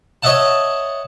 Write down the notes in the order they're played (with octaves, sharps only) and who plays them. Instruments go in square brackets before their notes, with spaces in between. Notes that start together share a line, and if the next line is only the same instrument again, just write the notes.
[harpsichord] C#5 D#5 E5 F#5 A5